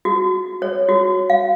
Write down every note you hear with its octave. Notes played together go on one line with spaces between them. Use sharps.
F#4
C#5
F#4
F5